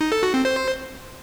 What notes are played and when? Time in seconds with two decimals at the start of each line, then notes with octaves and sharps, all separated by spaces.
0.01 D#4
0.12 A4
0.23 F#4
0.34 C4
0.45 C5